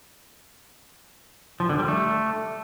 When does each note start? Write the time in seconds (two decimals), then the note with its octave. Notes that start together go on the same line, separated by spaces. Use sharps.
1.60 F3
1.69 D3
1.79 G3
1.88 A3